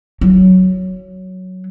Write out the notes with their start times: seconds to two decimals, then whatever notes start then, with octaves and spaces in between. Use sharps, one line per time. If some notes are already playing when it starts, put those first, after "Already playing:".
0.21 F#3